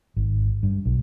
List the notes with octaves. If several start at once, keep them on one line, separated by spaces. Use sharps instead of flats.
G#1
G2
B1